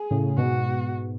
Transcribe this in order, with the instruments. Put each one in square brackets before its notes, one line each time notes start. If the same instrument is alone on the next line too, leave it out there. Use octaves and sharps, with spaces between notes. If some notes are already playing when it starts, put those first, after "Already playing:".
Already playing: [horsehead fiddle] G#4
[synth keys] A2 C#3
[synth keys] G#2 B2 [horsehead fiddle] F#4